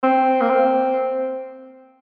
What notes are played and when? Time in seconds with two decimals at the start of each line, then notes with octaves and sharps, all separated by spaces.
0.03 C4
0.41 A#3
0.49 C4